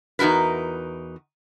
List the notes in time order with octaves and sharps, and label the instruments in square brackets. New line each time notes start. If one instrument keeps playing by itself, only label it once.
[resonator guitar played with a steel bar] E2 D#4 F#4 A#4 B4